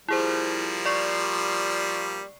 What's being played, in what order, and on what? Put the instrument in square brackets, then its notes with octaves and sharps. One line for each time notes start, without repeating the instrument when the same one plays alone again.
[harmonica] F3 G3 A#3 [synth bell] E4 G#4 C5
[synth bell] D5 C#6 C7